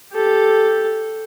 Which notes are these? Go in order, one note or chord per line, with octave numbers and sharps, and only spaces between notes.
G4 A4